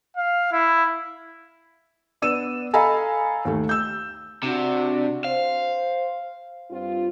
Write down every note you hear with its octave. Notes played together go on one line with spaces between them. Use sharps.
F5
E4
B3 D4 E6 D#7 E7
A4 D#5 F5 G#5 A#5 B5
D#2 A3
E6 G6
C3 D4 F#4
C5 F5
G2 C4 F4